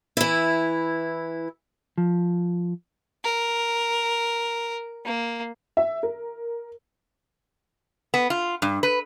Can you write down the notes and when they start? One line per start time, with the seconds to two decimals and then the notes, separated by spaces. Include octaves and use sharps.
0.17 E3 E4
1.98 F3
3.24 A#4
5.06 A#3
5.77 E5
6.03 A#4
8.14 B3
8.30 F4
8.62 G2
8.83 B4